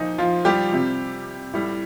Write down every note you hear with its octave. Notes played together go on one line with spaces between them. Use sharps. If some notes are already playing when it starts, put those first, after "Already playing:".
Already playing: A#2 F3 D#4
F3 F4
G3 G4
C3 G3
A2 G3